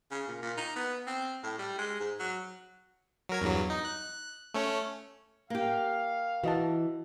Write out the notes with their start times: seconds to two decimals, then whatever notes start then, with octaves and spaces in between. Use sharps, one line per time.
0.11 C#3
0.28 A#2
0.42 A#2
0.57 D#4
0.76 B3
1.07 C4
1.43 A2
1.58 G3
1.78 G#3
2.00 G#2
2.19 F#3
3.29 F#3 A#4 G#6
3.41 E2 G2 F#3
3.70 D#4
3.85 F#6
4.54 A3 C#4 C#5
5.50 A#3 G4 F5
6.44 E3 F#4 D#5 A5